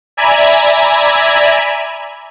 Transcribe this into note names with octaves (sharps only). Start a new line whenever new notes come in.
D5 E5 G#5 A#5 B5 G#6